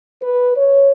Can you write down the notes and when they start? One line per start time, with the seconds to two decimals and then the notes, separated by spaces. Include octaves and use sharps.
0.22 B4
0.56 C#5